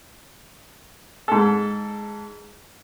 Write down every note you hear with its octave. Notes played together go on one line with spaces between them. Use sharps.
G#2 A4